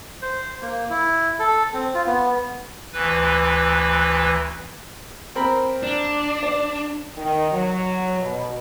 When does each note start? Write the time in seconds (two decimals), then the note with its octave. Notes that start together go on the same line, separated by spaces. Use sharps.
0.22 C5
0.62 A#3
0.90 E4
1.39 A4
1.74 C4
1.94 F4
2.06 B3
2.93 D2 E3 B4
5.35 C4 A#4 B5
5.83 D4
6.43 D5
7.17 D#3
7.51 F#3
8.20 B2